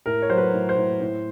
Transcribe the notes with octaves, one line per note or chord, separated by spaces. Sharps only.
A2 A#4
C#5
F#3 C5
B4
A2
C5
A2
A2